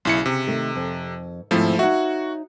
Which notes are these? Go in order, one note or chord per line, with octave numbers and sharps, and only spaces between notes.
B1 C#3 E4 C#7
C3
D#3 A3 A#4
F2
D#2 G#2 F3 A3 C4 E4
D#4 F#4 C#5 E5 F#5